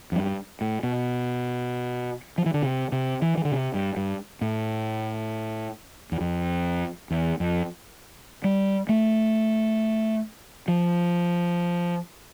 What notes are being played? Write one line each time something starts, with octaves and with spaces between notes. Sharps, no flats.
F2
G2
A2
B2
F3
E3
D3
C3
C3
E3
E3
D3
C3
G2
G2
A2
E2
F2
E2
F2
G3
A3
F3